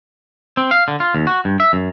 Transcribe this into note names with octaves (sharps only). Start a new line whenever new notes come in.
C4
F5
D3
F4
D#2
F#4
G2
E5
F#2